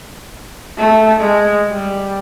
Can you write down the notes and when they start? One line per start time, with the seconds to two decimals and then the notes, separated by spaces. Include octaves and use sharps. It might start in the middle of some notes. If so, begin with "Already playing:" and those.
0.78 A3
1.19 G#3
1.70 G3